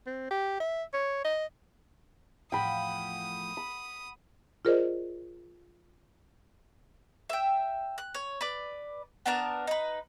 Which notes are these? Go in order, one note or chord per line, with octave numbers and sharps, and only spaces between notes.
C4
G4
E5
C#5
D#5
E2 A2 F3 F#5 G5 B5 D#6
B5
F4 G#4 A#4 C5 D5 D#5
E5 G5
F#6
C#5
B4 D5
B3 D4 A#4 A5
D#4 B4